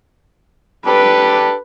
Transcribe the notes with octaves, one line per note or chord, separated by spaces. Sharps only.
D4 G4 A4 B4